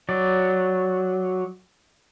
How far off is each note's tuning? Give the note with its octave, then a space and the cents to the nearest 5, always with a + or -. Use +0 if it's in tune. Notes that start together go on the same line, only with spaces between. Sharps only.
F#3 +0 D5 +0